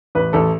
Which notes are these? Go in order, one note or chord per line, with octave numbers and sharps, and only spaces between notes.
A1 B4
A1 A4